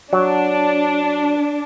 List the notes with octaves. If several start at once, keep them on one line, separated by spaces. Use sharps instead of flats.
F#3 D4